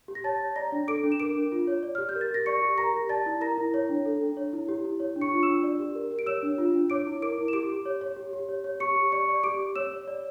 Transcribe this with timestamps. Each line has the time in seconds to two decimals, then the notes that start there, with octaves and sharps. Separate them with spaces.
0.08 G4
0.15 A#6
0.24 C#5 A5 A6
0.40 C#5
0.56 D5 A#5 A#6
0.72 D4
0.88 A4 D6 D7
1.04 D4
1.12 E7
1.20 A#4 D6 D7
1.36 D4
1.52 F4
1.67 C#5
1.83 D5
1.95 G4 F6
2.09 G6
2.15 A#4
2.21 A6
2.31 G4 A#6
2.46 D5 C#6 C#7
2.62 G4
2.78 A#4 A#5 A#6
2.94 G4
3.09 D5 A5 A6
3.26 E4
3.41 A#4 A#5 A#6
3.58 E4
3.74 C#5
3.89 D4
4.06 A4
4.21 D4
4.37 C#5
4.53 E4
4.69 G4
4.85 E4
5.00 C#5
5.16 D4
5.21 C#6 C#7
5.32 F4
5.43 D4 E6 E7
5.63 D5
5.79 G4
5.95 A#4
6.11 G4
6.19 D7
6.26 C#5 E6 E7
6.43 D4
6.58 F4
6.74 D4
6.90 C#5 D6 D7
7.07 E4
7.22 A#4 D6 D7
7.38 E4
7.48 E7
7.53 G4 D6 D7
7.69 G4
7.86 C#5
8.01 C#5
8.17 G4
8.33 G4
8.49 C#5
8.64 C#5
8.80 G4 C#6 C#7
8.96 G4
9.12 D5 C#6 C#7
9.28 D5
9.43 G4 D6 D7
9.60 G4
9.76 C#5 E6 E7
9.91 C#5
10.08 D5